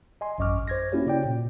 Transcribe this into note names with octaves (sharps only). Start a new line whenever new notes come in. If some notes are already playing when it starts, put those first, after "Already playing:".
D#5 G#5 C6
A1 F#2 D#5 C#6 D6 F6
C5 G#6 A#6
A#3 C#4 E4 F#4 G4 C#5
C#3 D5 G5
A#2